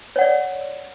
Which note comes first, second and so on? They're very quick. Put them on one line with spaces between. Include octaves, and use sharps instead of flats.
C#5 F#5 D5